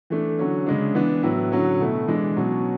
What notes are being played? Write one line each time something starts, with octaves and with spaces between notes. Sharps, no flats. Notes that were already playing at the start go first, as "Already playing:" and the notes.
E3 A3 D4
D3 F#3 C#4
C#3 G#3 D4
E3 B3 D4
A2 F#3 B3 E4
D3 F#3 C#4
B2 A3 E4
E3 G#3 D4
B2 F#3 C#4